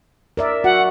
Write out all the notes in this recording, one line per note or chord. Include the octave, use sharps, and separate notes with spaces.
A#4 D5 E5
F#4 F#5